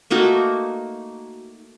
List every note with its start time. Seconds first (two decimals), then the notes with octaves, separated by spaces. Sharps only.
0.10 A3 A#3 D#4 F#4